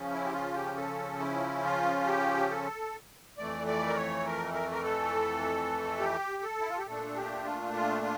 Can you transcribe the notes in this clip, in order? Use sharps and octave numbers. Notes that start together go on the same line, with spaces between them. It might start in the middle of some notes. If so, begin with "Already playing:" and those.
Already playing: C#3 F3 C#4
E4
G4
F4
G4
A4
E4
F4
G4
A4
F2 E3 A3 D5
D5
A#4
C#5
A#4
A#4
A#4
A4
G4
A4
E4
F4
G4
A#2 A3 D4 A4
G4
F4
F4
F4